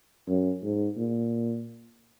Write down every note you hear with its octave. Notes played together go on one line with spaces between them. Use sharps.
F#2
G#2
A#2